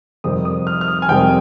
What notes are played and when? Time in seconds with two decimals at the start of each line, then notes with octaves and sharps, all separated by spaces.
0.24 F2 C3 D#3 G3 C4 D#6
0.45 D#6
0.67 F6
0.81 F6
0.88 D#6
1.02 G#5
1.09 F2 C3 D#3 G3 C4 G5